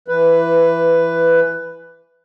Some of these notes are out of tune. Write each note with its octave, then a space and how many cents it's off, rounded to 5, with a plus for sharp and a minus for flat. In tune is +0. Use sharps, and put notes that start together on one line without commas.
E3 +15 B4 +10